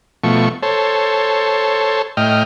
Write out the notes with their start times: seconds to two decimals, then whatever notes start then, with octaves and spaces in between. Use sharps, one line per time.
0.24 B2 F3 A3 C#6
0.63 A4 C5 C#5
2.17 A2 D#5 G5 F6